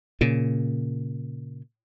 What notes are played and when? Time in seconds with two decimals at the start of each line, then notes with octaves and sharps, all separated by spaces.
0.21 A#2 C#3